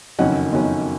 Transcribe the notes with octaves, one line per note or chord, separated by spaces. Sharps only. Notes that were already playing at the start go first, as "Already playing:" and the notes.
F#1 F2 D#3 F#3 C#4 D#5 F#5
F#1 F2 D#3 F#3 C#4